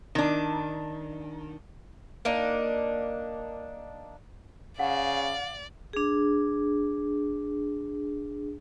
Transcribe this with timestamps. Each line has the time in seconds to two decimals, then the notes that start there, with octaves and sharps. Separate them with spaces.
0.15 D#3 D4
2.25 A#3 D4 D#4
4.79 C#3 D5 F5 F#5
5.93 D4 G#4